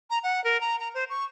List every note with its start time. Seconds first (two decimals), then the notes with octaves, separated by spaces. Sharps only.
0.10 A#5
0.24 F#5
0.44 A#4
0.61 A#5
0.80 A#5
0.94 C5
1.10 C#6